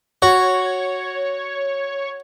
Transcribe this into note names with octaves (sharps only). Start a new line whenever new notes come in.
F#4 C#5